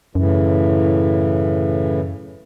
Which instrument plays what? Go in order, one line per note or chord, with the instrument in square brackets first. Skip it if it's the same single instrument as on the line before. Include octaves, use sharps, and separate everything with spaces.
[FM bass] F#2 [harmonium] A2 C#3 E3